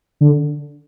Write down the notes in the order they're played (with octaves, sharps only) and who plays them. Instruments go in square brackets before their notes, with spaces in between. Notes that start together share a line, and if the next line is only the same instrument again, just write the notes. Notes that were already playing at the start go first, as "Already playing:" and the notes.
[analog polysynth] D3